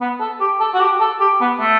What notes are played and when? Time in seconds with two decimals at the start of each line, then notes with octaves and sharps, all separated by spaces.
0.01 B3
0.20 A4
0.41 G4
0.60 A4
0.74 F#4
0.81 G4
1.00 A4
1.21 G4
1.41 B3
1.60 A3